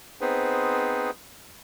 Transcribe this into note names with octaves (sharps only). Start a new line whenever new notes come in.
B3 C4 D#4 G#4 B4 C5